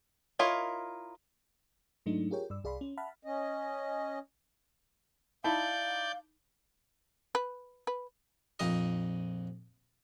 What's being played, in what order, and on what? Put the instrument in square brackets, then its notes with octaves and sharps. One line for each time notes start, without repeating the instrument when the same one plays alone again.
[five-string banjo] E4 F4 A#4 C#5 D#5
[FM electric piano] G#2 F#3 G#3 A3 D4 D#4
F4 G4 G#4 A#4 C#5 G5
G2 D5 E6
C2 G#4 D5 F5 B5 C6
C#4
E5 F#5 A5 B5 F6
[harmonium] C#4 D#5
[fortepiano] D#4 E4 B5 [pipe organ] D5 G6 [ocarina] F5 [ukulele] A5
[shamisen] B4
B4
[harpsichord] A#1 F2 D#4 D#5